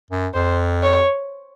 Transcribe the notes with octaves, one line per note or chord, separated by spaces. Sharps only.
F#2
F2 C5
C#5